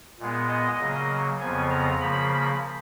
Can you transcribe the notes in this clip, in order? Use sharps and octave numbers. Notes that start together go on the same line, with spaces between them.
A#2 G#3 B3
D#5
C#3 F#3 A#3
F2 C#3 F3 B3 G#5
A#5
C#3 F3 A#3 B5